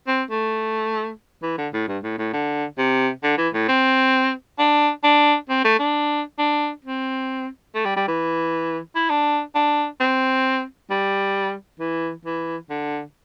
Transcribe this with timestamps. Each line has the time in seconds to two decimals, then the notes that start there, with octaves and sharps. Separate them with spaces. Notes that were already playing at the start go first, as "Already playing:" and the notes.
0.07 C4
0.31 A3
1.43 E3
1.58 D3
1.73 A2
1.88 G2
2.04 A2
2.18 A2
2.33 D3
2.78 C3
3.23 D3
3.38 E3
3.54 A2
3.68 C4
4.59 D4
5.04 D4
5.49 C4
5.64 A3
5.79 D4
6.39 D4
6.85 C4
7.75 A3
7.85 G3
7.96 G3
8.08 E3
8.96 E4
9.10 D4
9.55 D4
10.00 C4
10.90 G3
11.80 E3
12.25 E3
12.70 D3